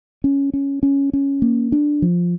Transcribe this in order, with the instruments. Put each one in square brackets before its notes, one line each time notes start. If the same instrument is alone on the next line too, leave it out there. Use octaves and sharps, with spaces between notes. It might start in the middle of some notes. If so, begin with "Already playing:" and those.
[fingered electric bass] C#4
C#4
C#4
C#4
A#3
D4
F3